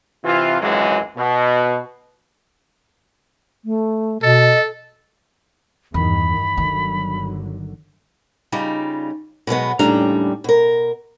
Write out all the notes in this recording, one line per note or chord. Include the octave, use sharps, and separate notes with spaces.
C3 E3 F4
G#1 C#2 F#2 E3 F#3 G#3
B2
A3
B2 A4 D#5
E2 G2 D#3 B5
G1 D3 D#3 F#3
C#3 G3 D#4 F4
B2 F#3 G#3 B3
D#2 A2 C#3 G3 D4 A#5
B2 A#4